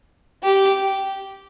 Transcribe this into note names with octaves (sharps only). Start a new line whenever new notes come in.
G4